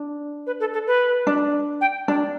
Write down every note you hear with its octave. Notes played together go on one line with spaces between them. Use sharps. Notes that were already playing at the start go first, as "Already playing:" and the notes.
Already playing: D4
B4
A4
A4
B4
D4
G5
D4